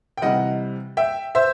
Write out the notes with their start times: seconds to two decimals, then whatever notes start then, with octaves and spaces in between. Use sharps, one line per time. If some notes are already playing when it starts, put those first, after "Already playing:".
0.17 G5
0.22 C3 E3 G3 D#5 F#5
0.97 E5 G5
1.35 C5 E5